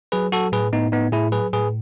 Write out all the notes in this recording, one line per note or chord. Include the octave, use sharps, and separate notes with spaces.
F#3 G#4 B4
F#3 F#4 A4
A2 G#4 B4
A2 B3 D#4
A2 B3 D#4
A2 E4 G#4
F#3 G#4 B4
A2 G#4 B4